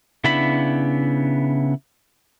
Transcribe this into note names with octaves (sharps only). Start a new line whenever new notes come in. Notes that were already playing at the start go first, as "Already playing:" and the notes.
C#3 B3 D4 E4 B5